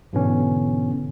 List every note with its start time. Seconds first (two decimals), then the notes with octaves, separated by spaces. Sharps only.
0.13 G#2 B2 D3 E3 B3 C#4